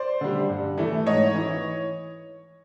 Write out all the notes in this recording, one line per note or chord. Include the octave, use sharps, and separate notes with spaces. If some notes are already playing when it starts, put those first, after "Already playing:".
Already playing: C5 D5
D3 G3
G2
E3 A3
G#2 C#5 D#5
E3